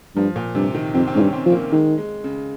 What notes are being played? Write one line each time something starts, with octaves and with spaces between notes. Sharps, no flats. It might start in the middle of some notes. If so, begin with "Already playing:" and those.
G2 F3
A#2
G2 C3
D#3
F2 C4
C4
G#2 C#4
G2
C4
F3
A#3
D#3 G#3
G#3
C#3